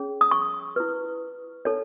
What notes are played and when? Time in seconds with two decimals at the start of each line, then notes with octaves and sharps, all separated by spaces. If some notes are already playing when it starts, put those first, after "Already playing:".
Already playing: C#4 G#4 C#5
0.21 D#6
0.31 C#6
0.76 E4 B4
1.65 D#4 A4 C#5